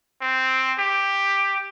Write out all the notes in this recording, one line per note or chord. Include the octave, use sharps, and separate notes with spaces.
C4
G4